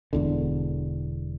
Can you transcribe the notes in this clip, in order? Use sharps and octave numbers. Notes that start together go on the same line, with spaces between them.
E1 E2 D3